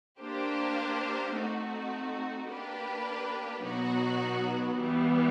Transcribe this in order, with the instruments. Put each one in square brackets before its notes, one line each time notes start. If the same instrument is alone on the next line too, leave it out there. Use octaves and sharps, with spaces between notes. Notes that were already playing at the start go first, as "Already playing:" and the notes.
[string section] A#3 D4 G4 C5
A3 C4 D#4 F#4
A#3 D4 G4 B4
B2 F#3 B3 D#4 F#4
E3 G3 B3